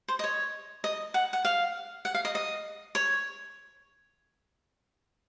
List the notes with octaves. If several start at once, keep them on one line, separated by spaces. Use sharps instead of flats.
C5
D#5
C#5
D#5
F#5
F#5
F5
F#5
F5
D#5
D#5
C#5